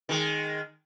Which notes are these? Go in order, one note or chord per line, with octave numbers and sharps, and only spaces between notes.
D#3 G#3